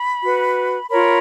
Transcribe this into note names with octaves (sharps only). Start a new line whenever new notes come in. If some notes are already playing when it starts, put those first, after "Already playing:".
Already playing: B5
F#4 B4
F4 A#4 C#5 B5